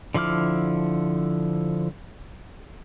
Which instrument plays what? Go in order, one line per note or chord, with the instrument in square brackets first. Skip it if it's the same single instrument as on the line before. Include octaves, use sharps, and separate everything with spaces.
[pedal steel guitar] D3 F3 E4 D6 F6